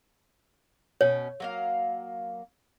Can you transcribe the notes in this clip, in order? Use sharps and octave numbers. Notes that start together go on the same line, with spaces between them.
B2 C#4 C#5
F#3 A#3 F5